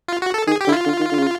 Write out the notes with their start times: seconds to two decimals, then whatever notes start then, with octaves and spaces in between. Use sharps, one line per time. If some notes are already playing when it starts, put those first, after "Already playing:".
0.08 F4
0.22 F#4
0.34 A4
0.47 D#3 G#4
0.61 G4
0.67 D3 E4
0.72 F4
0.86 D3
0.99 D#3
1.11 D3
1.18 C#3